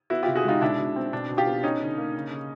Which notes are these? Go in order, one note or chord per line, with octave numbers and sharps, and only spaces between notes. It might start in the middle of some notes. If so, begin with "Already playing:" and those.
B3 E4 F#4
F4 G4
C3
F#4 G#4
G#3 D#4 F4
B2 D4 E4
B2
C4
B2 D4
B2
F4 G4
B3
C#4 D#4
D3
A#3
C#3
C#3